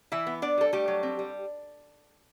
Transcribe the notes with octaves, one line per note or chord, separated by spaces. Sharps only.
E3 E4 E5
B3
B3 D4 D5
G3 A4
G3 A3 G4
F#3
C4
G3